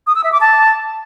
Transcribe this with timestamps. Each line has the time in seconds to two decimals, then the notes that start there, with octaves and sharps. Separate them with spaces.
0.07 D#6
0.15 E6
0.24 E5
0.32 D6
0.41 A5